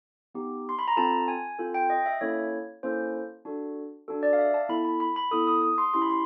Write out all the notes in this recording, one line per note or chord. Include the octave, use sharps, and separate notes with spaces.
B3 D#4 G4
C6
B5
A#5
C4 F4 A4 A5
G#5
C4 F4 A4
G5
D#5
E5
A#3 C#4 E4 A4 C#5
A#3 C#4 E4 A4 C5
D4 F#4 A4
D4 F#4 A4
D5
F5
E5
A5
B3 E4 A4 B5
B5
B5
B5
B3 E4 A4 D#6
D#6
D#6
C6
C#4 E4 G4 C6
B5
C6